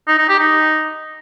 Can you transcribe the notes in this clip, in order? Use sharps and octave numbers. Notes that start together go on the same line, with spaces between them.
D#4
D#4
G4
D#4